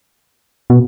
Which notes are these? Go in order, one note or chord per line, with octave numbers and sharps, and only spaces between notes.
B2